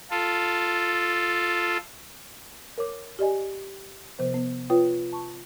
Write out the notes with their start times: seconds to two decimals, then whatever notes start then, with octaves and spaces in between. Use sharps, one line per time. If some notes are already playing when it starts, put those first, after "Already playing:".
0.10 F4 A4
2.78 A#4 C#5 D6
3.19 G4 D5 D#5 G#5
4.19 C3 F3 B3 C5
4.34 B3
4.70 F4 B4 C#5 G5
5.13 A5 C#6